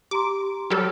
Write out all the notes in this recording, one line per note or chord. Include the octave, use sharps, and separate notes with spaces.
G4 A#5 C6 D6
F#3 G3 A4 F6